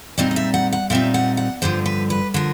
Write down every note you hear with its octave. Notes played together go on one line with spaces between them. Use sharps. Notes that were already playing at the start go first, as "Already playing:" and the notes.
A#2 G3 C4 D#4 D#5
D#5
E5
F#5
F#5
A#2 G3 C4 D#4 E5
F#5
F#5
G2 D3 F3 C5
B4
B4
D3 F3 A#4